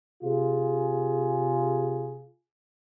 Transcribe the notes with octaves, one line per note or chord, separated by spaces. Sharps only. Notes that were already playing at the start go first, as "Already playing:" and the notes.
C3 F4 G#4